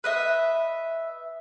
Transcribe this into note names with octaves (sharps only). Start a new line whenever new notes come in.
B4 D#5 E5